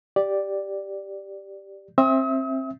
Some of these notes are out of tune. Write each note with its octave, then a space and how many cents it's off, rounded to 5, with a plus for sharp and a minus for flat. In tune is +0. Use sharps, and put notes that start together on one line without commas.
G4 +0 D5 +0
C4 +25 E5 +0 D#6 +45